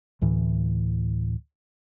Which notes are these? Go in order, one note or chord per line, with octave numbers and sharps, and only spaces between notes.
D2 A2 E3